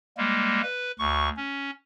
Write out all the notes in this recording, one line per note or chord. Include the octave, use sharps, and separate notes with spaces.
G3 G#3 A#3
B4
D2 C#6
C#4